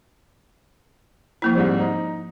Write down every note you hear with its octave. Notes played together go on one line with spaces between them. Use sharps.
F3 A#3 E4
G#2 G3 C4
D#4